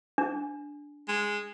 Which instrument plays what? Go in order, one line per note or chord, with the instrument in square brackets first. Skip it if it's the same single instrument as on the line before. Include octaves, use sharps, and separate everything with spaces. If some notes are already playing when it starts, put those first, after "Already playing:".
[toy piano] D4
[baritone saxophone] G#3